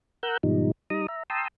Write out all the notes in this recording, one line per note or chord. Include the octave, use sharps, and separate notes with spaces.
A#4 F#5 A#5 E6 F#6 G6
G#2 B2 D#3 F3 G3 D#4
G3 D#4 A#5 D#6
E5 A#5
G5 A5 A#5 C6 D#6 E6